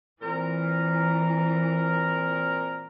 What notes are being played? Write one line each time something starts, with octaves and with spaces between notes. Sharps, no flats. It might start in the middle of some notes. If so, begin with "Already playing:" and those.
A#2 E3 C4 A#4